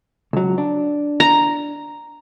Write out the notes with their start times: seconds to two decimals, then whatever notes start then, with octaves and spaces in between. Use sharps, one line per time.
0.33 C#2 F#3
0.58 D4
1.20 A#5